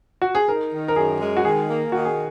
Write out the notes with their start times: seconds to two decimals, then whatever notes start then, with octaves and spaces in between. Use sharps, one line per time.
0.22 F#4
0.35 G#4
0.48 D#4 A#4
0.72 D#3
0.88 A#4
0.96 F#2 G#4
1.20 G#3
1.37 F#4
1.44 D#3 G#4
1.68 A#3
1.92 D#3 F#4
2.05 G#4